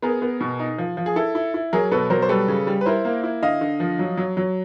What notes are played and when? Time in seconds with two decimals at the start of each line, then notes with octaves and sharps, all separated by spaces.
0.02 B3 G#4 A#4
0.22 B3
0.41 B2
0.59 D#4
0.78 F3
0.97 F3
1.06 G#4
1.16 E4 A4
1.35 E4
1.54 E4
1.73 F#3 G#4 A#4
1.92 B2 A4 B4
2.10 F#3 A#4 C5
2.22 C5
2.29 G3 A4 B4
2.48 C#3
2.67 G3
2.81 B4
2.86 E4 A#4 C5
3.05 A#3
3.23 E4
3.42 D3 D#5 F5
3.61 D3
3.80 F3
3.99 F#3
4.17 F#3
4.37 F#3